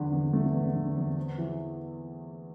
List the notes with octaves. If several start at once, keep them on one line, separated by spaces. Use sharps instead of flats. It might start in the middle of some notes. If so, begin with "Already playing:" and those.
Already playing: E2 D3
E2
A3
E2
D3
E2
C4
E3